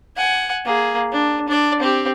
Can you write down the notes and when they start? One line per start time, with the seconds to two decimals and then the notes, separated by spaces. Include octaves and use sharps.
0.17 F#5 G#5
0.65 A#3 G#4
1.12 D4
1.48 D4 D5
1.80 C4 G4